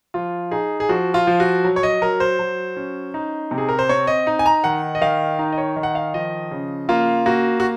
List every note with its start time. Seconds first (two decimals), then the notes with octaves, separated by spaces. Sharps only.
0.14 F3 F4
0.51 D#4 G#4
0.80 G#4
0.89 F3 F#4
1.14 F4
1.27 F3
1.40 F#4
1.64 F#3
1.76 C#5
1.83 D#5
2.02 F#3 A#4
2.20 C5
2.39 F#3
2.77 C#4
3.14 D#4
3.51 C3
3.58 G#4
3.69 A#4
3.79 C5
3.89 C4 C#5
4.07 D#5
4.27 D#4
4.39 G#5
4.46 A#5
4.64 D#3 F#5
4.95 D#5
5.01 D#3 F5
5.39 D#4
5.52 D#5
5.58 C#5
5.76 D#3
5.83 F#5
5.95 F5
6.14 F3 D#5
6.51 C#3
6.89 A#3 F4
7.26 A#3 F#4
7.60 F#4